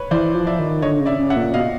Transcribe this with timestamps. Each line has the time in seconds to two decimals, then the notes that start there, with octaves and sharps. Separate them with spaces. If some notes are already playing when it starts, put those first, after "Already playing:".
Already playing: B4 C#5
0.11 E3 C5 D5
0.34 F3
0.47 D5 E5
0.59 D#3
0.82 D3 C#5 D#5
1.00 C#3
1.06 D5 E5
1.19 C#3
1.30 E5 F#5
1.36 A#2
1.54 B2 D#5 F5